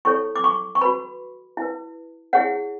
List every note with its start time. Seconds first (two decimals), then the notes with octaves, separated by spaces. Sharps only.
0.05 E4 A4 C#5 C#6
0.36 D6
0.44 C#6
0.75 C#6
0.81 F#4 B4 B5
1.57 E4 B4
2.33 E4 G#4 C#5 F#5